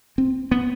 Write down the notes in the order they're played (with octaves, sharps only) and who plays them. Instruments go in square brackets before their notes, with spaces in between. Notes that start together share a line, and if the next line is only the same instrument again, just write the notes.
[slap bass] C4
B3